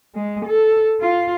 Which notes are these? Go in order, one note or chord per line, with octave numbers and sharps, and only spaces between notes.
G#3
A4
F4